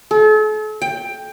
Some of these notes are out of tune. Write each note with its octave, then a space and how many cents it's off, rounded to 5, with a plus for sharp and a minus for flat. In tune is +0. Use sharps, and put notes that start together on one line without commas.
A4 -40
G5 +15